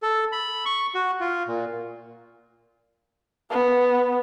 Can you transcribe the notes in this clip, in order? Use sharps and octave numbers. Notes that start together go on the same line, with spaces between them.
A4
B5
C#6
F#4
F4
A#2
B3